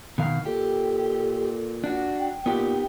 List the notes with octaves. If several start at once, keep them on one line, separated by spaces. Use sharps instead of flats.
B2 D#3 F5
A#2 G4 A4
D4 F#4
G5
A#2 B3 D#4 G4 G5